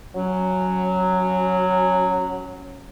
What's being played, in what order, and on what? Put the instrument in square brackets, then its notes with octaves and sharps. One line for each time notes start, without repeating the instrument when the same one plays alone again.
[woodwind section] F#3 C#4